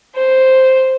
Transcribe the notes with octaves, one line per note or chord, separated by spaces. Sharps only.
C5